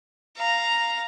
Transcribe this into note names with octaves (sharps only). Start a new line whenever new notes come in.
F5 A#5